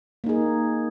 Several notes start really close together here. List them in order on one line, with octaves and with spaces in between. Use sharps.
A#3 D#4 G#4